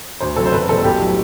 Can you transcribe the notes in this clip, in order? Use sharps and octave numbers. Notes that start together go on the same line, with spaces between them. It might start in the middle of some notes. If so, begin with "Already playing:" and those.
D2 C5
C3 F#3 A4
C5
F#1 B4
E2 B2 G3 A4
B1 G4
A2 F#3